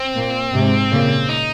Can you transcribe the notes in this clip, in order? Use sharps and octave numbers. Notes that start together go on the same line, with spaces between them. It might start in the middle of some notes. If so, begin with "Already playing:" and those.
Already playing: C4
A#2
G#2 C3
A#2 C#3
D#4